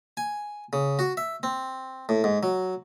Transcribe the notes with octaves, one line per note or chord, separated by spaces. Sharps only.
G#5
C#3
F#4
E5
C4
A2
G#2
F#3